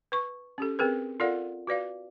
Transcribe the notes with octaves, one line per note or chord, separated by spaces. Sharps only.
B4 C#6
C#4 G4 A4
C4 G#4 A#4 B4
F4 A4 A#4 D5 F5 F#5
F#4 B4 D5 F5